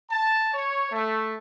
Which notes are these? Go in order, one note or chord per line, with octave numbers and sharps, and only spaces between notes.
A5
C#5
A3